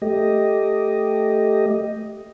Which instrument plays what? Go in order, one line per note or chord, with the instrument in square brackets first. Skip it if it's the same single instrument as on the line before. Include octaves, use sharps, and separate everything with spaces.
[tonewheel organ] A3 G4 D#5